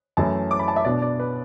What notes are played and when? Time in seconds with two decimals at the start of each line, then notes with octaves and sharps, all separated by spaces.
0.17 F#2 E3 A3 E4 A5
0.51 D6
0.59 B5
0.68 A5
0.76 E5
0.85 B2 B3 D4 D5
1.02 D5
1.20 B4